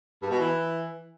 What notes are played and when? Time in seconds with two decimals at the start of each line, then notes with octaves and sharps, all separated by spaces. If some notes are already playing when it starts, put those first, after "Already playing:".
0.21 G2
0.30 B2
0.38 E3